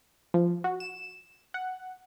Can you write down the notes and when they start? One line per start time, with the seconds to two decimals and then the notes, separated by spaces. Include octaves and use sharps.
0.34 F3
0.64 F#4
0.80 E7
1.54 F#5